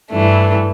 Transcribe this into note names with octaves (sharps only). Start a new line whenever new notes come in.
G2 E3 A3 D4